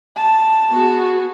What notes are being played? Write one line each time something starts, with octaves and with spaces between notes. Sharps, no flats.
A5
B3 F#4 G#4